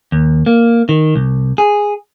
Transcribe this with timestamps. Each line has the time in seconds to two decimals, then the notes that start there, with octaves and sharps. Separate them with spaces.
0.12 D#2
0.46 A#3
0.89 D#3
1.16 C2
1.58 G#4